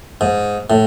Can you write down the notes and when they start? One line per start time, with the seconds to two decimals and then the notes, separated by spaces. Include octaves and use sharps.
0.21 G#2
0.70 A2